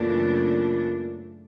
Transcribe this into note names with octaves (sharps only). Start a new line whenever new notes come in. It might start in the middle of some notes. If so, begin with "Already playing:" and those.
Already playing: F#2 A#2 C#3 E3 A3 D4